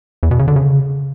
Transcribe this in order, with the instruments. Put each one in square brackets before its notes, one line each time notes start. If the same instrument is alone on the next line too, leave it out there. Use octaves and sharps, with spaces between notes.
[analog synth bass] E2
B2
C#3
D3
C#3